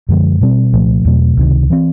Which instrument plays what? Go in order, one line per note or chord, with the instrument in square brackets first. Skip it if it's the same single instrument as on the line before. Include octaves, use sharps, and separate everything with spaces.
[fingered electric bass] F#2 D3 F3 G#3
B2 G3 C4
C2 A#2 F3 A3
E2 B2 F#3 A3
C#2 C3 D#3
E3 G#3 C4